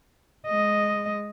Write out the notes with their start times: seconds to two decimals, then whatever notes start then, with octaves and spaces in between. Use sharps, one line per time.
0.47 G#3 D#5